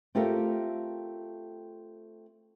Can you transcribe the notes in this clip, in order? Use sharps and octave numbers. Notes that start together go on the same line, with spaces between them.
A3 C4 F4 G4 A4 A#4